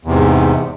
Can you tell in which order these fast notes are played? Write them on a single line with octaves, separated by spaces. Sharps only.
E2 C3 G#2